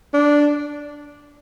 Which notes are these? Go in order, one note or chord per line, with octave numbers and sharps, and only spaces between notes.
D4